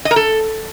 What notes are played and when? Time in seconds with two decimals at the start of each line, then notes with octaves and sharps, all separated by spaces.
0.05 D#5
0.11 A#4
0.16 A4